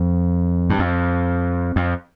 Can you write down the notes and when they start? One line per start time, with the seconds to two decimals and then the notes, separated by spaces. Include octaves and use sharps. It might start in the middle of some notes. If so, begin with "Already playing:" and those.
Already playing: F2
0.70 G2
0.79 F2
1.76 F2